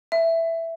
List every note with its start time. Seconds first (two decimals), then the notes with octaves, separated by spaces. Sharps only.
0.12 E5